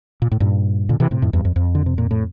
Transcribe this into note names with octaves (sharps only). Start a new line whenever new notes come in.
A#2
A2
G2 A#2
A#2 D3
C3 E3
A2 C3
F2 A2
E2 G2
F2
F2
D3
C3
A#2
A2